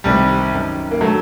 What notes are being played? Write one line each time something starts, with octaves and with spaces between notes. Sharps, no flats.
C2 C3 D#3 G3
F#2 D#3
A#3
D3 F#3 A3